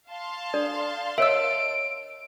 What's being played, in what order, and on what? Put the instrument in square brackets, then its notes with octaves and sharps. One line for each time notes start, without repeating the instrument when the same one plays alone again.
[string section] F5 A5 C6
[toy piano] D4 A4 D5
[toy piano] A#4 C#5 D#5 [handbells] E5 E6 [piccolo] D7